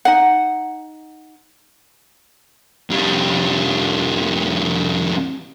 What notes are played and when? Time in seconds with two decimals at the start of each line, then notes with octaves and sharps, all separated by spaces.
0.05 D#4 F#5
2.90 F2 G3